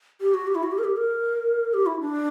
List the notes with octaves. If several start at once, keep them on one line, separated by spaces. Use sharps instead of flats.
G4
F#4
G4
E4
F#4
G4
A#4
G4
A#4
G4
E4
D4